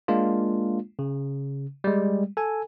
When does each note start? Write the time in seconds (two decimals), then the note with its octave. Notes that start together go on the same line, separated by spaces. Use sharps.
0.08 G#3 A#3 D4 F4
0.99 C#3
1.84 G3 G#3
2.37 A4 G#5